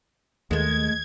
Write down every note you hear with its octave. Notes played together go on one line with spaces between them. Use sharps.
D#2 D#3 G#3 A3 G#6